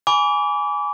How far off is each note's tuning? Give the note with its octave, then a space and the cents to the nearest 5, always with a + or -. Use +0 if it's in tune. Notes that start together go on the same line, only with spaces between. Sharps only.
G#5 +0 B5 +0 D6 -30